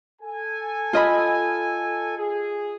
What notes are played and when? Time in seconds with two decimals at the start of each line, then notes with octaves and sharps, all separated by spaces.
0.22 A4 G#5
0.93 F4 D#5 B5
2.18 G#4